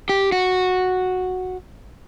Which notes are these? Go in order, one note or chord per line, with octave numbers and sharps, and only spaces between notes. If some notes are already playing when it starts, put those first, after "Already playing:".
G4
F#4